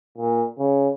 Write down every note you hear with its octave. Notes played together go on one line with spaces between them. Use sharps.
A#2
C#3